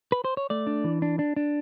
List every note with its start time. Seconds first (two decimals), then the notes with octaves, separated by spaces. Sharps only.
0.12 B4
0.25 C5
0.37 C#5
0.50 A3 D5
0.67 D4
0.84 E3
1.02 D4
1.19 D4
1.36 D4